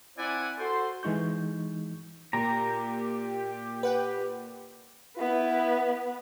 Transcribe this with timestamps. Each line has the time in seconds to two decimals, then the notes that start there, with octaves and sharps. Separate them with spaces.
0.16 C4 E4 D5 E5 F#5 G#5
0.58 F#4 A4 C5 C6
1.03 E3 G#3 D#4 C#6 G6
2.33 A#2 G4 A#5
3.83 B4 F#5 G5
5.18 B3 E4 B4